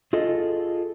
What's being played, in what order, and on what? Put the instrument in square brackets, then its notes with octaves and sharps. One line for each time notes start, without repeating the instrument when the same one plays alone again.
[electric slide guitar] F4 G#4 A4 D#5